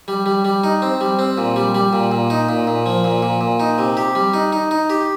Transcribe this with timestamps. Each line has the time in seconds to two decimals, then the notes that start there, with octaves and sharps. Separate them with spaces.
0.08 G3
0.26 G3
0.45 G3
0.64 D#4
0.82 C4
1.01 G3
1.19 C4
1.38 A#2
1.56 G3
1.75 G3
1.93 A#2
2.11 A#2
2.30 D#4
2.49 A#2
2.67 A#2
2.86 F3
3.04 A#2
3.22 A#2
3.41 A#2
3.60 D#4
3.78 C3
3.97 G4
4.15 G3
4.34 D#4
4.53 D#4
4.71 D#4
4.90 G4